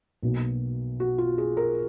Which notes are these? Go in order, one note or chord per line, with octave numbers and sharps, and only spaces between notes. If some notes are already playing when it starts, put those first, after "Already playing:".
B1 B2 A#3
F#4
F4
G#4
A#4